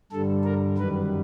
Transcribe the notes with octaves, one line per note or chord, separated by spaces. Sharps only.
G2 D3 G3 A4
A#4
F#2 D#3 G3 B4